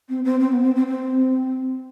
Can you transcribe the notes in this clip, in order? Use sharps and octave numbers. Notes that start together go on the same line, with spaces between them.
C4
C4
C4
B3
C4
C4
C4